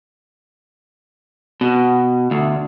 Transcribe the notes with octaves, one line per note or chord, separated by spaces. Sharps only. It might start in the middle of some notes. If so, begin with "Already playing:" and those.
B2
D2